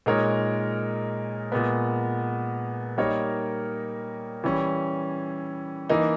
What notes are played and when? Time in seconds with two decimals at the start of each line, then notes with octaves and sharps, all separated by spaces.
0.06 A#2 G#3 D#4 A#4 C#5
1.52 A#2 G#3 B3
2.98 G3 A#3 D#4 A#4 C#5
4.44 E3 G3 C#4
5.89 E3 A#3 D#4